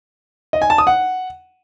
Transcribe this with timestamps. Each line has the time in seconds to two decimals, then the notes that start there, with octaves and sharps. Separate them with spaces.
0.53 D#5
0.62 G#5
0.70 A5
0.78 D#6
0.87 F#5